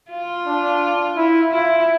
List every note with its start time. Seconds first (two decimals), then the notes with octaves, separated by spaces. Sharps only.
0.11 F4
0.46 D4
1.16 E4
1.51 E4 F4